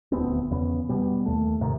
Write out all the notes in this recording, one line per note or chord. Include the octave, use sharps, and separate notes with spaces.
D#1 D2 B3 C4
E2 C#3 B3
B2 G3 B3
D#2 A3
D#2 G#2 C3 D#3